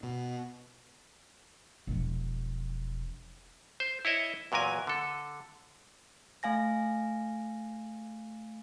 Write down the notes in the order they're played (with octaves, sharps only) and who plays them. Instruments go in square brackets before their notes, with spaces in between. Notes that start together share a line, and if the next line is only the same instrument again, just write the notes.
[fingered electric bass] B2
[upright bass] E1 F3
[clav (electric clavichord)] C5
E4 C#5 D#5 E5
E2 A#2 F#3 A#4 G#5
D3 A4
[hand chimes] A3 F5 G#5 A#6